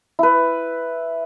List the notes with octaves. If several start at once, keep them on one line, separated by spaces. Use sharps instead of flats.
E4 B4